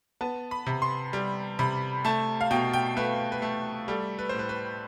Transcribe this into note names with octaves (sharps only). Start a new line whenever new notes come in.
B3 A5
B5
C3
C6
G3
C3 B5
A3 A5
F5
B2 G5
G5
A3 B4
B4
A3 A4
G3 A4
B4
C5
A2 B4
B4